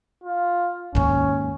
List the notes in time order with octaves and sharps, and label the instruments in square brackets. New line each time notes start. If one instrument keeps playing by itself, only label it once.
[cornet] F4
[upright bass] D#2 G#2 [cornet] C#4